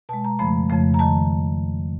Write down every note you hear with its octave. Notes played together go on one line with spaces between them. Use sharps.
B2 G#3 A5
A#5
F2 C#3 F3 A3 B5
F2 C#3 F3 A3
A#5
D#3 A5